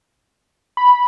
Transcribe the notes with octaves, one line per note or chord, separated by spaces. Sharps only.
B5